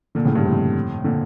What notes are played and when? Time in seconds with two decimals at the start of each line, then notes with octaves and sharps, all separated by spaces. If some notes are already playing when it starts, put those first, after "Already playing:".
0.15 A#2 D3
0.25 A2 C#3
0.35 G2 A#2
0.45 F2 A2
1.04 A#2 D3